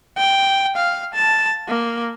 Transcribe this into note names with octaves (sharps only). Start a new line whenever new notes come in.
G5
F5
A5
A#3